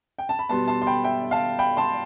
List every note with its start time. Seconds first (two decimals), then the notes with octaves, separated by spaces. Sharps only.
0.19 G5
0.29 A5
0.39 B5
0.49 B2 G3 B3 A5 C6
0.68 A5 C6
0.82 C6
0.87 G5 B5
1.04 E5 G5
1.31 F5 A5
1.59 G5 B5
1.77 A5 C6